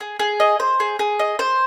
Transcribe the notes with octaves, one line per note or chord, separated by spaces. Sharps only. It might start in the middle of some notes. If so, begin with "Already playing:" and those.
G#4
G#4
D#5
C5
G#4
G#4
D#5
C5